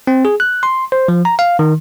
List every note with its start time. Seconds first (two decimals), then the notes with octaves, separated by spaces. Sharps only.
0.07 C4
0.25 G#4
0.40 F#6
0.63 C6
0.92 C5
1.08 F3
1.25 A#5
1.39 F5
1.59 D#3